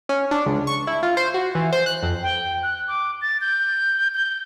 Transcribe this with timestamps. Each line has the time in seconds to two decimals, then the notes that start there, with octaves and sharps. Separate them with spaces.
0.09 C#4
0.31 D4
0.46 C#2
0.67 C#6
0.87 E4
1.03 F4
1.17 C5
1.34 F#4
1.55 E3
1.72 C5
1.86 F#6
2.03 F2
2.23 G5
2.63 F#6
2.88 D6
3.22 A6
3.41 G6
4.14 G6